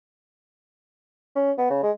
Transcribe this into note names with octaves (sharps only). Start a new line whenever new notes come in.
C#4
B3
C#3
G#3